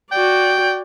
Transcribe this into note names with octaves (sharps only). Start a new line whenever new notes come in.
F#4 D5 G5